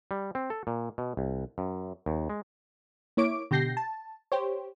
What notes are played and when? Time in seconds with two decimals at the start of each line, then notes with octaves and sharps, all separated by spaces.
0.11 G3
0.35 C4
0.50 A4
0.67 A#2
0.98 B2
1.17 C2
1.58 F#2
2.06 D#2
2.30 G#3
3.17 A#3 E4 C#5 D6 D7
3.51 B2 D3 G4 G6 A#6 C7
3.77 A5
4.32 G4 C5 C#5